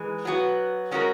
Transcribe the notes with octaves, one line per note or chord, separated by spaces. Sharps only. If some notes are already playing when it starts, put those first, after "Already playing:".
Already playing: E3 G#3 D#4
F#3 B3 F#4
G#3 C#4 F#4 A#4